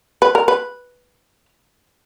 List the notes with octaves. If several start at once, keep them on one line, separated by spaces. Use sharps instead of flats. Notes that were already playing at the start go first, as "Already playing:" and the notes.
B4
A#4
B4